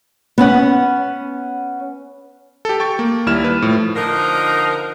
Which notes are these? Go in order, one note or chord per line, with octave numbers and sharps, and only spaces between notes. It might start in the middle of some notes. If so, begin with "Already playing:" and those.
B3 C#4 F#5
G4 A4
G5 C#6 A6
A#3
D#2 G3 E4 F6 E7
B4
A2 F3
D3 F3 D#4 A#4